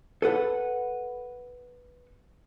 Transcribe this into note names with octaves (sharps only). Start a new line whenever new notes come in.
A4 B4 F#5